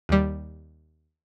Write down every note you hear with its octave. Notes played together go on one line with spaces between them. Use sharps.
D#2 G3